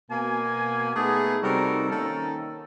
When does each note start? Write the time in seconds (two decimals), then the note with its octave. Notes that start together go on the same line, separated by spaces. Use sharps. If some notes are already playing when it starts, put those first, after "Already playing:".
0.10 B2 A#3 G#5
0.95 A3 B3 D#4 G#4
1.43 C3 G3 D#4 F#4 A4 A#4
1.90 D#3 A#3 C#4 A4